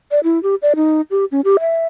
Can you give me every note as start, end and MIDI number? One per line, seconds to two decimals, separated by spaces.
0.11 0.20 74
0.24 0.41 64
0.43 0.55 67
0.62 0.73 74
0.76 1.01 63
1.11 1.25 67
1.32 1.41 61
1.45 1.57 67
1.60 1.87 76